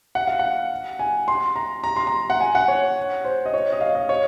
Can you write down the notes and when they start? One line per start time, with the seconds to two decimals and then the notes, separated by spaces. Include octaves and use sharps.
0.15 F#5
0.27 F5
0.39 F#5
0.99 G#5
1.28 C6
1.56 A#5
1.84 A#5
1.96 C6
2.07 A#5
2.30 F#5
2.41 G#5
2.55 F#5
2.68 C#5
3.25 C5
3.46 D#5
3.54 C#5
3.72 D#5
3.81 F5
3.95 D#5
4.09 C#5